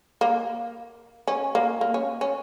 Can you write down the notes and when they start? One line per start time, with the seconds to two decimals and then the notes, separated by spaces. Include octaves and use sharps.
0.21 A#3
1.27 C#4
1.55 A#3
1.81 A#3
1.94 C#4
2.21 C#4